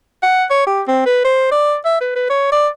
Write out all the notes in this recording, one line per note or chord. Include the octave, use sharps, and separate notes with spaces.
F#5
C#5
G4
C4
B4
C5
D5
E5
B4
B4
C#5
D5